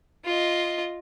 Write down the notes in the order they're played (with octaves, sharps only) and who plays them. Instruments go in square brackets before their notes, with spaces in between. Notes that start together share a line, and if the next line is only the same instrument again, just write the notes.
[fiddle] F4 D#5